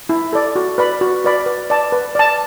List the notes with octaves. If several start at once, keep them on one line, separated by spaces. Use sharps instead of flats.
E4
A4 D5
F#4
B4 D5 B5
F#4
B4 D5 B5
B4
D5 A5
B4
D5 A5